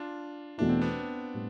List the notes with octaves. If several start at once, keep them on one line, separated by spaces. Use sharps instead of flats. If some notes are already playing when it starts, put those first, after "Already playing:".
Already playing: D4 F4
E2 B2 A3 D4 E4
C4
B3 D4
A2 G3